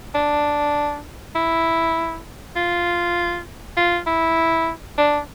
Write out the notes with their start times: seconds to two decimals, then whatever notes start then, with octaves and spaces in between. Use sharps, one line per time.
0.15 D4
1.35 E4
2.56 F4
3.77 F4
4.07 E4
4.98 D4